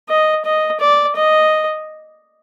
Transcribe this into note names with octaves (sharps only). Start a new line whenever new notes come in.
D#5
D#5
D5
D#5